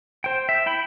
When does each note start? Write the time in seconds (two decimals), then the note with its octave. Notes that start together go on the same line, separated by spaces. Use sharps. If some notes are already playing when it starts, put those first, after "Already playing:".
0.24 C5 G5
0.49 E5
0.66 E4 G5 B5